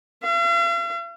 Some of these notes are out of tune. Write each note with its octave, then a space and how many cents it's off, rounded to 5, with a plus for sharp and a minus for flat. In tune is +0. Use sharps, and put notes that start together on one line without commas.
F5 -45